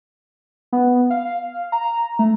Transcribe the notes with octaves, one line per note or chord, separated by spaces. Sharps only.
B3
F5
A#5
A3